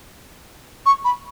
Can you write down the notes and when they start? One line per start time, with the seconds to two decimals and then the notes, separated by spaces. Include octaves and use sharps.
0.86 C#6
1.05 B5